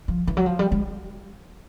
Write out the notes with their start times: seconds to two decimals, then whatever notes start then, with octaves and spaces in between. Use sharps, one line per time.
0.08 F3
0.27 E3
0.37 F#3
0.46 F3
0.59 G3
0.72 G#3